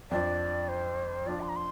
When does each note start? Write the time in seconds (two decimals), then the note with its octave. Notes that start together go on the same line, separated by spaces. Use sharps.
0.11 F2 F3 D4 D5
0.69 C5
1.26 F3 D4 F4 D5
1.41 C6
1.49 A#5
1.56 C6